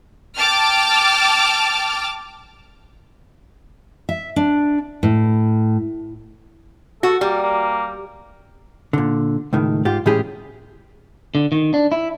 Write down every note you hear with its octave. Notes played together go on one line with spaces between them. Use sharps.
G5 A5 D6 F6
E5
D4
A2
F#4 A4
G3 A#3
A#3
A#2 D3
C#2 A2 D#3
G#2 F4 G4
A2 E3 G#3 C#4 G4 G#4
D3
D#3
D4
E4